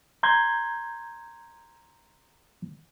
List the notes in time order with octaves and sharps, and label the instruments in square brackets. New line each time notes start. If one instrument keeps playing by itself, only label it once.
[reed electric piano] A#5 C6 G6 G#6